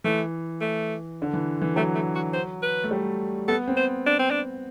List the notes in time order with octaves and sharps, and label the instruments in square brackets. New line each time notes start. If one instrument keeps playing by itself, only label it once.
[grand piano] E3 [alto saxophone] A3
[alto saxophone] A3
[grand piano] D3
E3
E3
[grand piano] F#3 [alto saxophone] A3
[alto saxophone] A3
F#4
C5
B4
[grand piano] A3
G3
[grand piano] B3 [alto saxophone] A4
[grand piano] C4
[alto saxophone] C5
D4
C4
D4